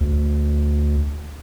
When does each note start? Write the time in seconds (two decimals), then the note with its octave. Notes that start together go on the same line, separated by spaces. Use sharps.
0.01 D2